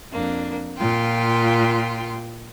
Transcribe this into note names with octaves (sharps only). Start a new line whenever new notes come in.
F2 A#3 D4
A#2 F4 G5 C6